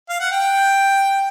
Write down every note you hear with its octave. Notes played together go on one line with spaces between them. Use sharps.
F5
F#5
G5